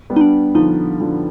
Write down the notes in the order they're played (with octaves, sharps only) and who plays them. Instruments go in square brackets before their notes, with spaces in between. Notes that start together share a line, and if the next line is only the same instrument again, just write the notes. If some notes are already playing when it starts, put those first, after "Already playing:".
[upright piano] G3 B3
[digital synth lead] D#4
D4
[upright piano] D3 F3 [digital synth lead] D#4
[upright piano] D3 F3